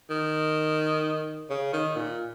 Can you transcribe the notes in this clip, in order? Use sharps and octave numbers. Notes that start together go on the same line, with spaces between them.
D#3
C#3
D#3
A#2